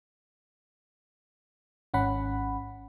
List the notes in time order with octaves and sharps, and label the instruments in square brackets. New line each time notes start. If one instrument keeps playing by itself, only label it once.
[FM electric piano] G#1 C#4 F#5 B5